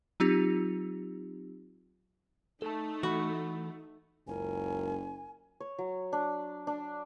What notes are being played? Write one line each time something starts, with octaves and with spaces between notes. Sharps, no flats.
F#3 C4 D#4 F4 G4
A3 D#4 A4 A5
E3 F#4 B5
F#1 C#2 F#2 A#4 G#5
C#5
F#3
D4
D4